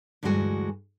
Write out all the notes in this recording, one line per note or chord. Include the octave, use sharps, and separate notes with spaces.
D2 G2 E3 G#3 F#4 G#5